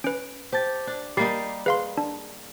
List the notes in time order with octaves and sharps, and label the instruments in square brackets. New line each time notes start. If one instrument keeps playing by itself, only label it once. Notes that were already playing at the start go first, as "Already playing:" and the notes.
[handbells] C#4 B4 [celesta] D7
[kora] G4 [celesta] C5 A5 A6
[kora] D4
[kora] G3 A#3 D#4 [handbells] G4 [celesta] A6 C7
[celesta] G#4 [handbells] B4 F5 C6
[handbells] D4